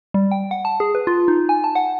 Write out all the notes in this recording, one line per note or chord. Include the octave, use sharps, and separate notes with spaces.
G3
G5
F#5
A5
G#4
B4
F4
D#4
G#5
A5
F#5